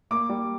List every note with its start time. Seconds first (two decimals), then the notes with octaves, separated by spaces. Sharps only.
0.11 A#3 D6
0.29 G3